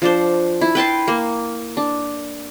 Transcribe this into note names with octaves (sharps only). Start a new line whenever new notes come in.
F3 D4 C5
E4
B4 G5 A5 C6
A#3
D4